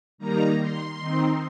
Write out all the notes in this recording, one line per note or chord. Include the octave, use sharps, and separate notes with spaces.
D#3 G3 A#3 D#4 A#5
C6
D#3 C4 D#4